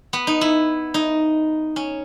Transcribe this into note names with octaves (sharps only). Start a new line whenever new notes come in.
B3
D#4
E4
D#4
C#4